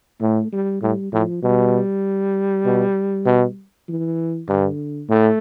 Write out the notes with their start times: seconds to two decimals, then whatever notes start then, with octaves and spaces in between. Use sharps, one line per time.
0.21 A2 A3
0.52 G3
0.82 A2 G3
1.12 A2 F3
1.43 B2 G3
2.65 B2
3.26 B2
3.88 E3
4.48 G2 D3
5.09 A2 A3